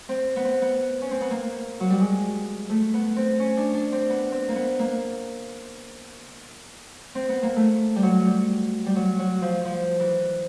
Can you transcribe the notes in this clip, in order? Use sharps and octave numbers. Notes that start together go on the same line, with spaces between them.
C4
B3
C4
B3
C#4
C4
B3
A#3
F#3
G3
G#3
A3
B3
C4
C#4
D4
D4
C4
B3
C4
A#3
B3
A#3
C4
B3
A#3
A3
G3
F#3
G3
G3
F#3
F#3
F3
F3
E3